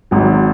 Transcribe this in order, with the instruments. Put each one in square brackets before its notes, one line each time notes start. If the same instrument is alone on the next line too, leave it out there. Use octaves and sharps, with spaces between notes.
[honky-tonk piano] G#1 G#2 F#3